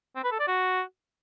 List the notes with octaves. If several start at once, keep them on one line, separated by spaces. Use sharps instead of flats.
C4
B4
A4
D5
F#4